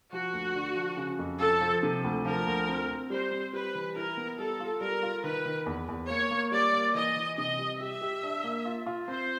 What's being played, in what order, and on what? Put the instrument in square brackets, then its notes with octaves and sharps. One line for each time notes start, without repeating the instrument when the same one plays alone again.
[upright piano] F3 [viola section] F#4
[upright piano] D2
D3
F3
C#3
F2
[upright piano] F3 [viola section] A4
[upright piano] F3
C3
D2
[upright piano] F3 [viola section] A#4
[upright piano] D2
C4
C4
[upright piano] G3 [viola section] C5
[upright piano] C4
[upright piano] G3 [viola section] B4
[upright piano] E3
[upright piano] E4 [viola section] A#4
[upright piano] B3
[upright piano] G3 [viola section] A4
[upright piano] F4
[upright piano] G3 [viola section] A#4
[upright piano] F4
[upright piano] D#3 [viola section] B4
[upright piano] D#3
E2
E2
[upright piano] A#3 [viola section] C#5
[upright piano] A#3
[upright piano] G3 [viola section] D5
[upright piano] A#3
[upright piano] E3 [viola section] D#5
[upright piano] E3
[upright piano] C3 [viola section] D#5
[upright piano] G3
[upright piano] G4 [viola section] E5
[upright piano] G4
D4
A#3
F4
F4
[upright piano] C4 [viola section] C5